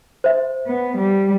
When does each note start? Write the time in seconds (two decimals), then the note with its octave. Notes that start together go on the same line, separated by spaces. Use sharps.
0.24 C5 E5
0.67 B3
0.97 G3